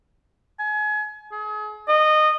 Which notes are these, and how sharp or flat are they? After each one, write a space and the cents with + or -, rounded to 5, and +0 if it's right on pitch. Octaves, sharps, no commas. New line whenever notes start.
G#5 +30
G#4 +35
D#5 -20